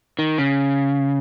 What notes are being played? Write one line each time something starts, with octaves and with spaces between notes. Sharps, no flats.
D#3
C#3